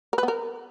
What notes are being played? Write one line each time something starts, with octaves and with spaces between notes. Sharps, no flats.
A#4
B4
B3
A#4